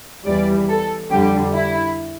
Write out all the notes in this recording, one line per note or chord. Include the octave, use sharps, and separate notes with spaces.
E2 E3 G3 D5
A4
F2 D3 G3 G4
E4